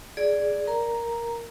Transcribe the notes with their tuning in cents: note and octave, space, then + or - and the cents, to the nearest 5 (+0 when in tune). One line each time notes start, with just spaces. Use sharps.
G#4 +0 D5 +0
A#4 +5 A#5 +0